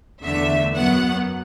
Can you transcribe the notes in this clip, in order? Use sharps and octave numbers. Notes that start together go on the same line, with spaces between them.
E2 D3 A3 E5
F#2 F#3 B3 F#5